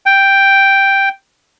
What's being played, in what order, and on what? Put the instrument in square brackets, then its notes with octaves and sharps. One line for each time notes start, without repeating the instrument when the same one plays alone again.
[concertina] G5